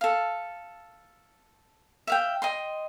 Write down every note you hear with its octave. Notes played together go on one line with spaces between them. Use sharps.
A4 F5
E5 F5 G5
D#5 G5 C6